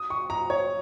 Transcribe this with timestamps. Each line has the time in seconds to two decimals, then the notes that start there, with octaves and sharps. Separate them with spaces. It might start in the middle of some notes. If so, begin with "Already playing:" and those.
Already playing: D#6
0.10 C#6
0.30 A#5
0.50 C#5